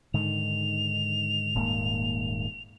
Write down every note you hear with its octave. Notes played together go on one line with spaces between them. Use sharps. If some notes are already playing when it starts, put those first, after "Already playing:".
G#2 D3 D#3 F7
D#1 G#2 A#3